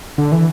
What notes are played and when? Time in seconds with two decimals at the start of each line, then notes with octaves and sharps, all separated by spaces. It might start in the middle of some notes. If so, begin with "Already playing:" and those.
0.18 D3
0.32 E3